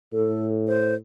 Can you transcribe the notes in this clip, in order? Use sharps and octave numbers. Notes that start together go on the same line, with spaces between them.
A2 A4
C5